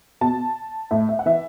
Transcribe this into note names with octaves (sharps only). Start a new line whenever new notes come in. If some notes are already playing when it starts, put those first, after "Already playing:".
B2 A5
A2 E5
E5
F#5
E3 E5